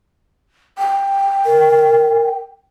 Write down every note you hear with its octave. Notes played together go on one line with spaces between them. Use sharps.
G5
A#4